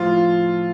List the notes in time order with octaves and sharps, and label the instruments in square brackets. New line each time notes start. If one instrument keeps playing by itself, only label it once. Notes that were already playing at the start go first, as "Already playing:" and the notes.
Already playing: [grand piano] A2 F3 F4